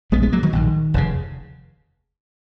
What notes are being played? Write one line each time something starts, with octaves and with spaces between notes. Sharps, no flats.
A#1 G#2 G#3 B3
G#3 B3
F#3 A#3
D#3 F#3
A#1 G#2
F1 D#2 C#3